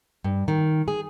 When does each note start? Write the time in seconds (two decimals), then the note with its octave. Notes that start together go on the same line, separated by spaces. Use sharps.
0.24 G2
0.48 D#3
0.88 G#4